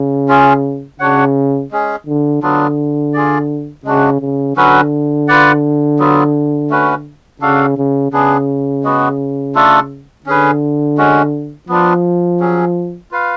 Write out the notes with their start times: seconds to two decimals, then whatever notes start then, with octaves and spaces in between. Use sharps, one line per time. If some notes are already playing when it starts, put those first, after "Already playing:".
Already playing: C#3
0.28 C#4 F4 G#4
1.00 C#3 D4 F#4 C#5 F#5
1.71 G#3 C#4 G#4
2.07 D3
2.42 D3 F#3 B3 D4 F4
3.14 F4 G#4 D5
3.85 C#3 G#3 D4 F#4
4.21 C#3
4.56 D3 F#3 C#4 F#4 B4
5.28 F4 B4 D5 F#5
5.99 F#3 B3 F4
6.70 A3 C#4 F#4 B4
7.41 C#3 D4 F#4 A4 F5
7.77 C#3
8.12 C#3 B3 D4 G#4
8.84 G#3 B3 F#4
9.55 A3 D4 F4 A4
10.26 D3 C#4 G#4 B4
10.97 G#3 C#4 F#4
11.69 F3 B3 D4 F4
12.40 F#3 C#4 G#4
13.11 F4 B4 F5